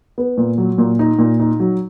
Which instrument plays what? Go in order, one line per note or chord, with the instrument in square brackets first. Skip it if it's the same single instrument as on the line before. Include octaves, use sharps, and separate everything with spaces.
[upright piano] B3
A#2
F#3
A#2
D#4
A#2
D#4
F#3